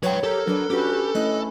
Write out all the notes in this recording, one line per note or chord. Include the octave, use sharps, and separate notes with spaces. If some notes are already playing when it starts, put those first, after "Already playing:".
F#3 B4 C#5 G5
G4 A4 A#4
F#3 D4 B4
C#4 D4 F#4 G4 B4
A3 C#4 E4 D#5 F#6